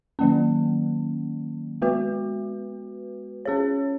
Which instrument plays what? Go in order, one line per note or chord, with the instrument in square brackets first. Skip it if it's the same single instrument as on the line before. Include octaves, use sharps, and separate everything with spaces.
[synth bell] D#3 F#3 A#3 C#4
G#3 B3 F#4 B4
C#4 G#4 C#5